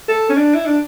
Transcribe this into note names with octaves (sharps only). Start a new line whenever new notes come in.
A4
C#4
D4
E4
D4